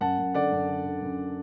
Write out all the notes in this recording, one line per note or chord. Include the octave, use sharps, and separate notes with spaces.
F#2 F#5 A5
F#2
D3 D5 F#5
F#2
D3
D3
F#2